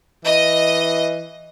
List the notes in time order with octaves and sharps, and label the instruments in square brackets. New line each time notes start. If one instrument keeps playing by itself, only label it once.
[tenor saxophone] E3 [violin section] D#5